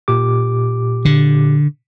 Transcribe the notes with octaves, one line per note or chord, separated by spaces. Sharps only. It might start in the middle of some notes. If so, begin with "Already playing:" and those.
A#2 G4 D6
D3